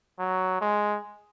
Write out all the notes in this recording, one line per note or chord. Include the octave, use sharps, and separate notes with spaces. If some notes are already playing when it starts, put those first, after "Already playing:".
F#3
G#3